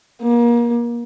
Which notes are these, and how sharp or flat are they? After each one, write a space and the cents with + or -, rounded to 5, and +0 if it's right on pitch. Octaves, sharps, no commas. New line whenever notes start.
A#3 +30